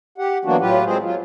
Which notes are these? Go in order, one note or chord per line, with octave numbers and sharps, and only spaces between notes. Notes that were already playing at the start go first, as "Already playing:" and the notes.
G4 F#5
E3 F#3 A#3 B3 D4 F#4
A2 F#3 F4 G4 B4
F#3 G#3 C4 G#4 C5
F#3 F4